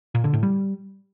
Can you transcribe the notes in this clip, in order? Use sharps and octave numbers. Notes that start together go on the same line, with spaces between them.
A#2
D3
A2
G3